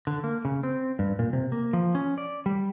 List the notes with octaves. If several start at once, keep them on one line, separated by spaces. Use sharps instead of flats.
D3
A#3
C#3
C4
G2
A#2
C3
A#3
F3
C#4
D5
G3